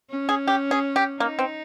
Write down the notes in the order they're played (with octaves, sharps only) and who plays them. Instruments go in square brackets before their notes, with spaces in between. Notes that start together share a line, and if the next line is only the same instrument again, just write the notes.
[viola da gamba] C#4
[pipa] G#4
G4
G#4
G4
[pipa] A#3 [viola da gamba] D#4
[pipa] C4